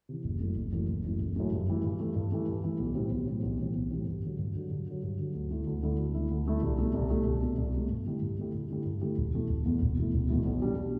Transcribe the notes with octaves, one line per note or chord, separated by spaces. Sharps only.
C3 E3
F#1
F#2 E3 A3
F#1
F#2 E3 A3
F#1
F#2 E3 A3
F#1
F#2 E3 A3
G2
E3 A3
G2
E3 A3
G2
E3 A3
G2
E3 A3
B1
A2 E3 G3 C4
B1
A2 E3 G3 C4
B1
A2 E3 G3 C4
B1
A2 E3 G3 C4
G2
D3 F#3
G2
D3 F#3
G2
D3 F#3
G2
D3 F#3
D2
D3 A3 E4
D2
D3 A3 E4
D2
D3 A3 E4
D2
D3 A3 E4
C2
B2 A3
C2
B2 A3
C2
B2 A3
C2
B2 A3
G2
D3 A3 E4 G4
G2
D3 A3 E4 G4
G2
D3 A3 E4 G4
G2
D3 A3 E4 G4
E1
E2 B2 A3 E4
E1
E2 B2 A3 E4
E1
E2 B2 A3 E4
E1
E2 B2 A3 E4
B1
B2 G3 D4